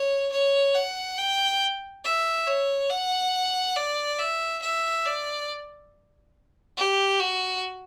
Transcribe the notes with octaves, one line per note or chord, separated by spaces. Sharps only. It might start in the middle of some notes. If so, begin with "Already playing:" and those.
Already playing: C#5
C#5
F#5
G5
E5
C#5
F#5
D5
E5
E5
D5
G4
F#4